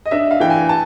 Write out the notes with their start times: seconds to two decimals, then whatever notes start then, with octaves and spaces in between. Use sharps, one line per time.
0.06 D#5
0.11 D4 E5
0.31 F5
0.40 E3 G5
0.50 G#5
0.69 A5